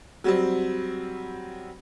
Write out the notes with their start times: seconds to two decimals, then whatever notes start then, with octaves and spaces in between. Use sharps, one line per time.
0.24 F#3 G3 C4